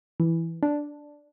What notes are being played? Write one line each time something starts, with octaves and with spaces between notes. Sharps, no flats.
E3
D4